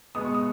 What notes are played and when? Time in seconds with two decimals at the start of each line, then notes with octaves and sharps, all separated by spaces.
0.15 B2 G#3 B3 D#6
0.25 C#6
0.35 D#6